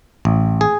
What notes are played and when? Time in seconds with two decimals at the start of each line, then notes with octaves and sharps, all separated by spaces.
0.25 A1
0.61 G#4